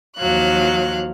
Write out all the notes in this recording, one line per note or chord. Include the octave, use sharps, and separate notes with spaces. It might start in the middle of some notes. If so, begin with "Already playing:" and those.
D#2 F3 F#3 F5 F#6